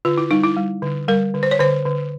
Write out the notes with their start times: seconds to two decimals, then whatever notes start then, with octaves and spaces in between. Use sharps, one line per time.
0.05 D3 F4
0.18 E4
0.31 G3 D#4
0.43 E4
0.57 G3
0.82 D3
1.08 G3 A#4
1.34 D3
1.43 C5
1.51 C#5
1.59 D3 C5
1.85 D3